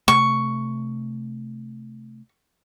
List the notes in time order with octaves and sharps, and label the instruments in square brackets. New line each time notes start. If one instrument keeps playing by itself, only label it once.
[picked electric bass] C3 A3 [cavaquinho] C#6